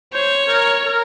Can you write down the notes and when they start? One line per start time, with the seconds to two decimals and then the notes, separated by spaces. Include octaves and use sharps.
0.13 C5 C#5
0.48 A#4
0.85 A#4